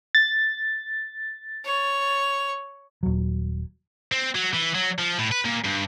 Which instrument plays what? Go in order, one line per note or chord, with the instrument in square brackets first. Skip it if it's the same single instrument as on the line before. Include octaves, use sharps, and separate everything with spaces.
[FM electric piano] A6
[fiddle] C#5
[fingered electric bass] D#1 F#3
[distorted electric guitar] C4
F#3
E3
F#3
F3
A2
B4
A#2
G2